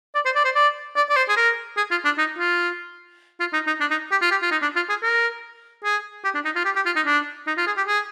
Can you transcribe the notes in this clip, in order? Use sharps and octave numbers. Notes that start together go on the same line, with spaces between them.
D5
C5
D5
C5
D5
D5
D5
C5
G#4
A#4
G#4
F4
D4
D#4
F4
F4
D#4
D#4
D4
D#4
G4
F4
G4
F4
D#4
D4
F4
G#4
A#4
G#4
G4
D4
D#4
F4
G4
G4
F4
D#4
D4
D#4
F4
G#4
G4
G#4